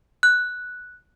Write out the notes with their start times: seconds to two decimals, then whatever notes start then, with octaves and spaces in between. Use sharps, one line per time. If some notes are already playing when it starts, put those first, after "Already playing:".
0.23 F#6